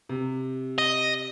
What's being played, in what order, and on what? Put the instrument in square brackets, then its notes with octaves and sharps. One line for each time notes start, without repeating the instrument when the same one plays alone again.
[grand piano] C3
[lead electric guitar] D#5